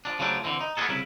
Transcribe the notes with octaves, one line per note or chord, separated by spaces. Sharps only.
F3 F#3 D4
C#3 F3 F#3 A3 D4
D3 E3 C4
D#4
A#3 B3 C#4 F#4 G#4 A4
C2 C#3 E4